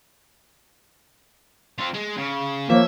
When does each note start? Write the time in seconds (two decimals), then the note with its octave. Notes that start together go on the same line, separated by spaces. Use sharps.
1.78 C4 F4
1.94 G#3
2.17 C#3
2.70 F3 A#3 C#5 E5